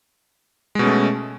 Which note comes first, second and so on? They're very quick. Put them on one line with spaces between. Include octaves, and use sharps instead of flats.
G#3 B2 C#4 A3